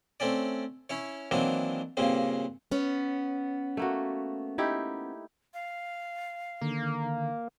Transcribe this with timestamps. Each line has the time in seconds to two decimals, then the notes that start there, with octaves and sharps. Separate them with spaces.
0.20 A3 C4 C#4 D5
0.90 C#4 E4 C#5
1.31 D#3 E3 F#3 A#3 C4 D4
1.97 G2 A#2 C#3 A#3 C4
2.71 B3 C#4
3.77 A3 A#3 F#4
4.58 D#4 E4 G4
5.54 F5
6.61 D3 D#3 A#3